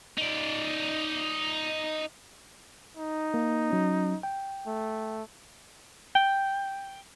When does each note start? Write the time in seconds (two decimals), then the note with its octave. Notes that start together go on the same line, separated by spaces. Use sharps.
0.18 D#4 D5
2.97 D#4
3.34 A#3
3.70 F#3 C#4
4.23 G5
4.67 A3
6.15 G5